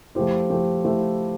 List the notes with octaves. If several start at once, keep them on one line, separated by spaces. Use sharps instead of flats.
F3 A3 E4 G4 C5
F3 A3 E4 G4 C5
F3 A3 E4 G4 C5